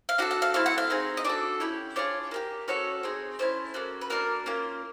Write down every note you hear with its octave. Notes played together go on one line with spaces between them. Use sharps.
F5
D4 F#4 A4 F#5
F#5
F5
A3 C4 E4 F5
F#5
F5
C4 D#4 G#4
D#5
D4 F#4 A4 D5
C#4 E4 G4
D4 F4 G#4 C#5
A#3 D4 G4
C#4 F#4 A4 C#5
C4 D#4 G#4
A3 C#4 E4 C5
A#3 C#4 F#4 A4
B4
A#3 D4 F#4 A#4
A#3 C#4 F4